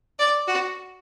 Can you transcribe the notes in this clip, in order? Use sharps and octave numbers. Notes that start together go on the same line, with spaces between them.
D5
F#4